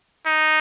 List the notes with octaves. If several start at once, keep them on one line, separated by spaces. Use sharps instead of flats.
D#4